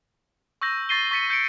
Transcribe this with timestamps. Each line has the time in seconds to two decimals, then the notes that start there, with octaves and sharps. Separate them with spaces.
0.62 C#6 E6 G6 A#6
0.89 C#6 A6 A#6 C7 D#7 G7
1.11 C#6 A6 B6 C#7 D#7
1.30 G6 C#7 D7